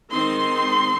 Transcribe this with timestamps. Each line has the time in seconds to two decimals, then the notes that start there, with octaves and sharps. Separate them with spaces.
0.12 D#3 G#3 C4 D#4 C6